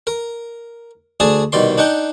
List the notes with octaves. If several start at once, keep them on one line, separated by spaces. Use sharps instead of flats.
A#4
D2 D4 G#4 A5 D#6
C2 B2 D#3 D5 C6
D4 D#4 F#5 G5